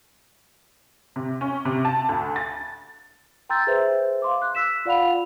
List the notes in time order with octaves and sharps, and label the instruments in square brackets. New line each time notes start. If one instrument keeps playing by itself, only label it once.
[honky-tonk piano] C3
C#4
C3
A5
D2
A6
[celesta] G5 A#5 C6 E6 G6 A6
G#4 B4 C5 E5
F5 C6 D6
F#6
E6 B6 E7
F4 D5 F5 F#5 B5 F7